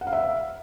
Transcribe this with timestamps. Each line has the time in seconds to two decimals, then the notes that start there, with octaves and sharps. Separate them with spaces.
0.01 F#5
0.07 F5
0.13 E5